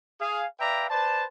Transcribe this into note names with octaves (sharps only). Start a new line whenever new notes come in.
G#4 F5
B4 D5 E5 F5 G5 A#5
B4 C5 D5 A5